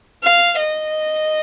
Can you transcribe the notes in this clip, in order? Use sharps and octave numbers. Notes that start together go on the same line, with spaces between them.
F5
D#5